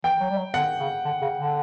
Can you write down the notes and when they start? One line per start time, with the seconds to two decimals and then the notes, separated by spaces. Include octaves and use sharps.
0.04 E3 G5
0.20 F#3
0.30 G3
0.37 F#3
0.54 D3 F#5
0.80 C#3
1.05 D3
1.21 C#3
1.38 D3